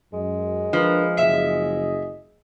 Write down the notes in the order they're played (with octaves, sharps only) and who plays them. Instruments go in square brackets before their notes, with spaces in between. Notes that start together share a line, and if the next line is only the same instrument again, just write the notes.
[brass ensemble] F#2 [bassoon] G#3
[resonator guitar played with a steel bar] F3 [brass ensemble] D4 A#4 B4
[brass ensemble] F#1 G#4 D#5 [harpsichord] E5